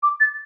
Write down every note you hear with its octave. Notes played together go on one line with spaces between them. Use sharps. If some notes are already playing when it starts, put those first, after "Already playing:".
D6
A6